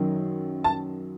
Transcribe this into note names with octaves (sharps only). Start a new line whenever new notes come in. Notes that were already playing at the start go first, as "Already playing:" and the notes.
Already playing: F#2 D#3 F#3
A5